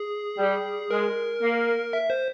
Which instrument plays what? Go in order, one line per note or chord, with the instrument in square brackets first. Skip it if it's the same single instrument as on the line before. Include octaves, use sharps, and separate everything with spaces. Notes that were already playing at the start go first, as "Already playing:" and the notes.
Already playing: [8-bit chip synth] G#4
[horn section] G3
[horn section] G#3 [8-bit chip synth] A#4
[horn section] A#3
[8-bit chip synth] E5
C5